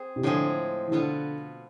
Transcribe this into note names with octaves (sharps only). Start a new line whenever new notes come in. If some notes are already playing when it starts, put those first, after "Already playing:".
Already playing: C4 G#4
C3
A2 D3 F3 G#3 C4 G#4
E3
B2 D3 B3 F4 A4